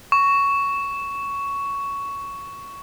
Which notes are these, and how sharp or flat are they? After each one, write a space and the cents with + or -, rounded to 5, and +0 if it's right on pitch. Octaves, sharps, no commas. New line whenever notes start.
C#6 +10